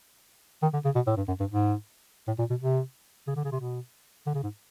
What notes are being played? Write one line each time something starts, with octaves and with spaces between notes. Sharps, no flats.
D#3
D3
C#3
B2
A2
G2
F#2
G2
G#2
A2
A#2
B2
C3
C#3
D3
C#3
C3
B2
D3
C#3
G#2